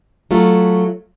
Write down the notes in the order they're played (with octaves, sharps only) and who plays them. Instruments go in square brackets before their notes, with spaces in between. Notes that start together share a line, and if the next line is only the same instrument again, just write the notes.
[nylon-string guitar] F#3 A3 F4